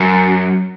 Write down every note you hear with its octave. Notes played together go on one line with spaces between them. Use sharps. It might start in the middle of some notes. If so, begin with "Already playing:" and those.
Already playing: F#2